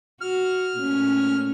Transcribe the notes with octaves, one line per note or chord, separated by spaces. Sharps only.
F#4 F6
A#2 A3 C#4